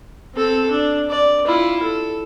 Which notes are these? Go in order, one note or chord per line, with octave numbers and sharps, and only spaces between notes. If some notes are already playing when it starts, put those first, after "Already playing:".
C4 A4
D4
D5
E4 F4
A4